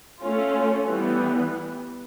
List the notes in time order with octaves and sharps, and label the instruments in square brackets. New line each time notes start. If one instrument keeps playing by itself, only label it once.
[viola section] A3 C#4 F4
E3 G3 B3